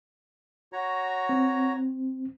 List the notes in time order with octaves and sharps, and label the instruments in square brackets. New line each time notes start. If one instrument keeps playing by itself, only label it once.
[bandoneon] F#4 C#5 A#5
[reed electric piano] C4